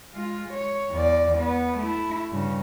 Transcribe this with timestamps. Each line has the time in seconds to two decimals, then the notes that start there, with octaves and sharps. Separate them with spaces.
0.13 G#3 F4
0.54 C#5
0.92 E2 D5
1.39 B3
1.79 A3 E4
2.32 G2 C#3